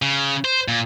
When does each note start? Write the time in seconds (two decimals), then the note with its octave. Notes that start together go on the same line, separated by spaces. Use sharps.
0.02 C#3
0.45 C5
0.68 A#2